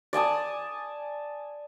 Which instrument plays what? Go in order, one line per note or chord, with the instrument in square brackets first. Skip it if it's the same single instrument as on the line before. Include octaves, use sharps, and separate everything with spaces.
[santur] D5 G#5 A5 D#6